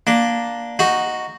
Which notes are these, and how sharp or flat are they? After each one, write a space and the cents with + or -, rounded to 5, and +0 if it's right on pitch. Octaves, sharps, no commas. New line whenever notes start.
A#3 +10 D4 +0
D#4 +0 F#4 +0